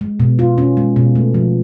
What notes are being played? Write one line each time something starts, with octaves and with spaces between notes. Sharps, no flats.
G#3
B2
F4
C#4
G#3
B2
A3
F3